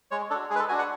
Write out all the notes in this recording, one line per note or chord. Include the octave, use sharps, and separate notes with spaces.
G#3 C#5
D4 F#4 A4
G#3 G#4
B4
A4
D4 F#4 G#5
F#5